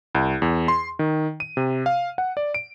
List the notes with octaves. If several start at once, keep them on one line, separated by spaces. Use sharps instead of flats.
C2
E2
C6
D#3
D#7
C3
F5
F#5
D5
D7